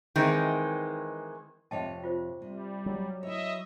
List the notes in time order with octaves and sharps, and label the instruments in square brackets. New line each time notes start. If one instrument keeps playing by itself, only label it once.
[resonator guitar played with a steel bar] D#3 E3 G#3 C4
[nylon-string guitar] F2 C3 C#5 [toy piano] D#5 G5 A5
[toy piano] F4 C5
[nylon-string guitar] C3 [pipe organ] G3
[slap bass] F#3
[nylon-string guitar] E4 C#5 [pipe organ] D#5 E5